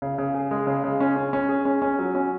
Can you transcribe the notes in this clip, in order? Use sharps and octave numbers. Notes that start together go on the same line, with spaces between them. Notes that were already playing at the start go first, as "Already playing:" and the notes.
C#3
C#3
G#4
G#3
C#3
C#3
C#4
C#4
C#4
G#4
C#4
C#4
F#3
C#4